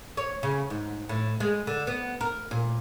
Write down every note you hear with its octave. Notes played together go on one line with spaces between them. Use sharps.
C#5
C#3
G#2
A2
G#3
D3
B3
A#4
A#2